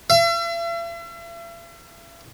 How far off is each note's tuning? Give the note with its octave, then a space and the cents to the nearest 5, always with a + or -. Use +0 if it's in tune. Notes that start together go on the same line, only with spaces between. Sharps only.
E5 +45